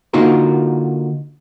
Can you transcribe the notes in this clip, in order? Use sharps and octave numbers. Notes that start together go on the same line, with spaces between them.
D3 A#3 D#4 F4 F#4 A#4